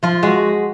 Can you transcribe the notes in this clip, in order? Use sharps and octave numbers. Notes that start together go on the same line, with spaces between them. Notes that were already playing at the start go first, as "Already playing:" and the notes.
F3 F4
G#3 F#4